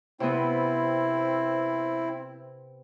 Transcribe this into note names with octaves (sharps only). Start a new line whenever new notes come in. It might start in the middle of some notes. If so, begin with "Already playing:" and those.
C3 B3 C4 E4